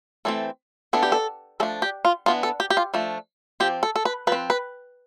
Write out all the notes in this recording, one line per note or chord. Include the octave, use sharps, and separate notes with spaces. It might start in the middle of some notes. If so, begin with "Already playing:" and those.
E3 A3 C4 A4
E3 B3 D4 A4
G4
A4
F3 A3 D4 A4
G4
F4
E3 B3 D4 F4
A4
G4
G4
F4
F3 A3 D4
F3 C4 G4
A4
A4
B4
F3 C4 B4
B4